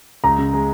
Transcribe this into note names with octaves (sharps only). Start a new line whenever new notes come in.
C#2 A#5
C#3
G#3